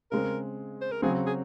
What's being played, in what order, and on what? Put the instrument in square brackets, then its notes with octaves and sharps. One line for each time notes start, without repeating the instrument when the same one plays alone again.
[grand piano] C#3 G#3 C4 [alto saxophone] A#4
[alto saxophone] C5
A#4
[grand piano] C#3 F#3 C4 [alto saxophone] G#4
[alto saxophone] G#4